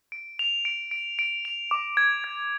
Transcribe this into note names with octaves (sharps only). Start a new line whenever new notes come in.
D7
F7
D7
D7
D7
F7
D6
G#6
G#6